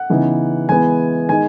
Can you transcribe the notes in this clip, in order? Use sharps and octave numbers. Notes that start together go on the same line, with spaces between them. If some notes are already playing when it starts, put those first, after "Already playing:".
Already playing: F#5
C#3 E3 B3 D#4
E3 G#3 B3 E4 G#5
D#3 G#3 D#4 G#5